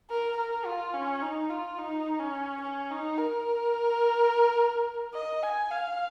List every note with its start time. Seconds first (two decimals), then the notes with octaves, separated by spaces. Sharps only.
0.10 A#4
0.37 A#4
0.65 F4
0.93 C#4
1.22 D#4
1.50 F4
1.78 D#4
2.19 C#4
2.61 C#4
2.90 D#4
3.18 A#4
5.14 D#5
5.43 G#5
5.71 F5